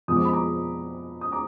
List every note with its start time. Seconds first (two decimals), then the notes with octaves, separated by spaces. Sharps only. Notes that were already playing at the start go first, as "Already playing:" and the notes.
0.08 F2 F3 G#3 B3 D#6
0.16 D6
0.25 B5
0.33 A#5 D6
1.21 D#6
1.32 A#5 D6